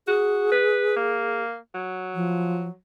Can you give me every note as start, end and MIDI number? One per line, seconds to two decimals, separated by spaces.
0.07 0.49 66
0.07 1.43 68
0.52 0.92 71
0.96 1.57 58
1.74 2.75 54
2.15 2.68 53